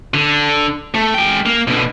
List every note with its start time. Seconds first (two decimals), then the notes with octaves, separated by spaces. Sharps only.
0.14 D3
0.94 A3
1.14 G#3 G5
1.46 A#3
1.68 B2 D3